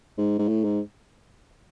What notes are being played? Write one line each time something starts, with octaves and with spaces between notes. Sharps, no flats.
G#2
G#2
A2
G#2